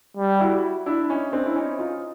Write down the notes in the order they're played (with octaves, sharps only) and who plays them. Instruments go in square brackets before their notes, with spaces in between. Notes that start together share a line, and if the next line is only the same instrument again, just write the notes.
[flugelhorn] G3
[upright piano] E4 F#4
D4 E4
C#4 D#4
C4 D4
E4
C#4 D#4
D#4 F4